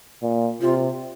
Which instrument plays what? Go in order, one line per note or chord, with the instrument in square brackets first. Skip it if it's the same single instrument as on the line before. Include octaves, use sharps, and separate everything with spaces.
[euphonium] A#2
[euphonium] C3 [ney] F4